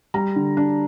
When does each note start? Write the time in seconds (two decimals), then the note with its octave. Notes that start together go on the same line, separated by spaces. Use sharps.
0.14 G3 A#5
0.36 D3
0.57 D4